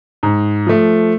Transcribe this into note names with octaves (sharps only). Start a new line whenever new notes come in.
G#2
F3 A3